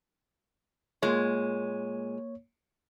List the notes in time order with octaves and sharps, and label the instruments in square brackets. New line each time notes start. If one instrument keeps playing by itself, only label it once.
[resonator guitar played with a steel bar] A#2 G#3 [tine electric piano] A#3 C#5